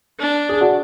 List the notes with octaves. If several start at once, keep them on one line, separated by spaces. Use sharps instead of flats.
D4
G#4
D4 F#4